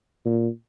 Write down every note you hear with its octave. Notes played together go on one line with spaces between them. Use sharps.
A#2